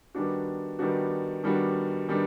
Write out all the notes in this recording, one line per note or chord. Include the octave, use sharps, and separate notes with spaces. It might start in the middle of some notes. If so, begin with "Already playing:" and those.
D#3 G3 B3 D4 F#4
D#3 G3 B3 D4 F#4
D#3 G3 B3 D4 F#4
D#3 G3 B3 D4